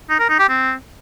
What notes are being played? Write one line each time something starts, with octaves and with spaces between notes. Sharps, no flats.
D#4
A#4
D#4
G4
C4